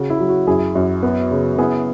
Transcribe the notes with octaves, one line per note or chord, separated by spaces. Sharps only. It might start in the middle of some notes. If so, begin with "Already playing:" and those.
Already playing: C#3 F#4
E4
F#3
F#4
F#2 E4 G#4
F#2
B3
C#3
B3 E4 G#4